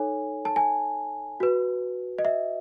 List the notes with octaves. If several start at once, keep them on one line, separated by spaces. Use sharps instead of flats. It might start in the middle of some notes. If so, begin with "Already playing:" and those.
Already playing: D#4 A4 C#5 G#5
A5
G#5
F#4 B4
D#5
E5